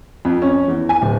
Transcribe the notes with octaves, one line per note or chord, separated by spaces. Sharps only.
F2
C#4
E2
G#5
D1